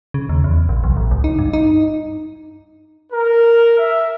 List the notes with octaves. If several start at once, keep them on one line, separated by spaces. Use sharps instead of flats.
C#3
D#2
E2
A#1
B1
A1
C#2
D#4
G2
D#4
A#4
E5